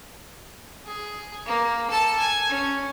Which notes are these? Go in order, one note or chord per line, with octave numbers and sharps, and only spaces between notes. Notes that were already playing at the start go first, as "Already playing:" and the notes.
G#4
A#3
A4 A5
G#5
C#4